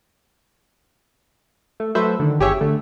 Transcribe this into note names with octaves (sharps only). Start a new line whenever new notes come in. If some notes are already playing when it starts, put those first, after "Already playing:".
A3
F#3 A3 A4 B4 C5 E5
D3 D#3
G1 G4 G#4 C#5 E5
D3 A3